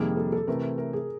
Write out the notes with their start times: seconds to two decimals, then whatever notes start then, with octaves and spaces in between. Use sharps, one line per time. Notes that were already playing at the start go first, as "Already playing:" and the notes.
Already playing: F2 C3 D#3 G3 A#3 G#4
0.17 A4
0.32 A4
0.47 C3 E3 A3 A#4
0.78 A#4
0.93 G#4